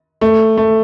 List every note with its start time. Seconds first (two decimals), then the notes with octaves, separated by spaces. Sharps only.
0.21 A3
0.57 A3